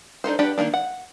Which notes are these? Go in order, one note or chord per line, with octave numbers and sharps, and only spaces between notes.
D4 D#4 A4 C5
D4 F#4 G4 B4 D5
D#3 A3 A#3 D4
F#5